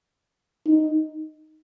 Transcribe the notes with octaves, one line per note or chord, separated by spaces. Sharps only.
D#4